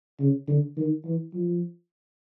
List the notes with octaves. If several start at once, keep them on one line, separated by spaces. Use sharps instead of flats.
C#3
D3
D#3
E3
F3